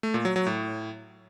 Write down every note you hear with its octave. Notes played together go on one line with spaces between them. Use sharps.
A3
A#2
F#3
F#3
A2